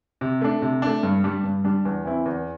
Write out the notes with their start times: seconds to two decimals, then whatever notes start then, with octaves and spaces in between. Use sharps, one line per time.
0.21 C3
0.41 A3 D4
0.62 C3
0.82 A3 D4
1.03 G2
1.24 G3 D4
1.44 G2
1.64 G3 D4
1.85 E2
2.05 E3 C4 E4
2.25 E2